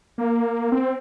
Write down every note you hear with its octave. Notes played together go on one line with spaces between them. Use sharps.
A#3
C4